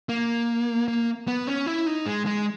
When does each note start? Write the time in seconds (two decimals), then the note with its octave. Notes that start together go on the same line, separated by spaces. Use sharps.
0.09 A#3
0.88 A#3
1.27 B3
1.47 C#4
1.66 E4
1.86 D#4
2.06 G#3
2.26 G#3